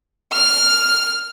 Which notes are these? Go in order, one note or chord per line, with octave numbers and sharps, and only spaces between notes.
F6